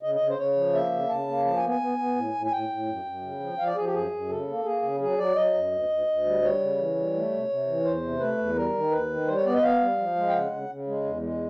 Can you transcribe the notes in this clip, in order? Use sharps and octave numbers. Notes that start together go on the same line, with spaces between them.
C#3 D#5
D#5
C#3
C5
C#3 C#5
F3
A#3 E5
C#3
C#3 A5
A#3
F3 A5
G#5
B3
G#5
B3
B3
A2
A2
G#5
A2 G5
A2
F#2
F#2
C#3
F3
F3 F5
D5
F3 G#4
G4
F#2 G#4
F#2
C#3 A4
A#3
A#3 G#4
C#3
F#3 G#4
F#3 D5
F#3 D#5
F#2
D2
D2
D2
G3
G3 C#5
C#3
E3
G3
A3
C3
C3
E3
E2 C5
C3
A3 B4
E2
G3 A#4
D#3
D#2 B4
D#3
G3 C5
C#5
B3 D5
D#5
B3 F5
G3
F3
G#3
G5
C#3 F#5
C#3
C#3
G#3
E2
G#3